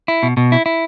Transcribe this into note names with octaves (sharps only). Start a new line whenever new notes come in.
E4
B2
B2
E4
E4